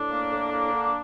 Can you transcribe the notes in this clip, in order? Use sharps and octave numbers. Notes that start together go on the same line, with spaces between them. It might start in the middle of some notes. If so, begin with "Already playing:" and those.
Already playing: A2 D4
A#3
A2
A#3
D3